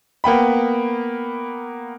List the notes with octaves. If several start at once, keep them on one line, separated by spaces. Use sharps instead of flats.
A#3 B3 G5 B5